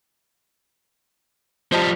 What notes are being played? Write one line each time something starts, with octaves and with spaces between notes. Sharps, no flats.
F3 G3 C5 D#5 A5